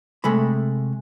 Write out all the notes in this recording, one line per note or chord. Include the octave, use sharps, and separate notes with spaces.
C3 G#3 A3 B5